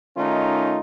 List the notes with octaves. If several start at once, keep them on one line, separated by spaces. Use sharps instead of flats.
D#3 A3 C#4 D#4 F4